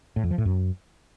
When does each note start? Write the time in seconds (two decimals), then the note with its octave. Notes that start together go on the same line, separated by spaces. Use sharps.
0.16 A2
0.24 F2
0.31 F3
0.38 A2
0.45 F#2